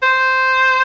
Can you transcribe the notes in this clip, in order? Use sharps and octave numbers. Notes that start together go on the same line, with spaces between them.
C5